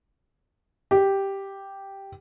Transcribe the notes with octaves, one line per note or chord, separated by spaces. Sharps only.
G4